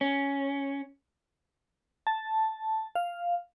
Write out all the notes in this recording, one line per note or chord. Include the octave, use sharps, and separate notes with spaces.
C#4
A5
F5